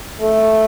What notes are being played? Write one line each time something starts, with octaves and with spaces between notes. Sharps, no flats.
A3